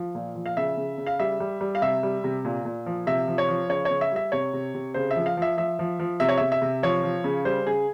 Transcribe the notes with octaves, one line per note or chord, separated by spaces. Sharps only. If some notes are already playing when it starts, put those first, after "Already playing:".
Already playing: F3
A#2
F3
F5
C#3 E5
C#3
C#3
F5
G3 E5
G3
G3
F5
C3 E5
G3
C3
A#2
A#2
F3
C3 E5
F3
C#5
F3
C#3 C#5
C#5
C#3
E5
G3 E5
C3 C#5
C3
C3
C#3 C5
E5
F3
F5
F3 E5
F3 E5
F3
F3
C3 E5
C#5
C3 E5
E5
C3
F3 C#5
F3
C#3
G3 C5
C#3 G#4